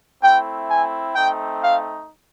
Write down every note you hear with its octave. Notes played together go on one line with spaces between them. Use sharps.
A3 C4 E4 G5
G#5
A3 C4 D#4 G5
F5